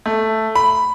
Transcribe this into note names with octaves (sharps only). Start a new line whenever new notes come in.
A3
B5